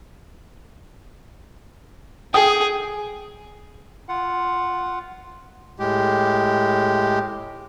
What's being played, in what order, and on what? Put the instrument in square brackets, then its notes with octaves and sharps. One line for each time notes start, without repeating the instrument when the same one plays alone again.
[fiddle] G#4 [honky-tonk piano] G5 D#6
[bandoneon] F4 F#5
A2 G#3 G4